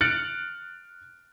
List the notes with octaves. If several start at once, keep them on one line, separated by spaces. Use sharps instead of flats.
F6 F#6 A6 C#7 D7 F#7